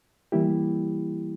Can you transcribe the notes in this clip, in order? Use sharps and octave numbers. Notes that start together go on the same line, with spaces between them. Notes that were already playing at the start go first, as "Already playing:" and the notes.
E3 G3 A#3 E4 G4